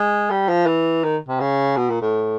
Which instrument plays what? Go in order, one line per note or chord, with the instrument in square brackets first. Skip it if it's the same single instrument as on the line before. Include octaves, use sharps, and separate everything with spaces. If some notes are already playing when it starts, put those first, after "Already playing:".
Already playing: [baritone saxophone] G#3
G3
F3
E3
D#3
C3
C#3
B2
A#2
A2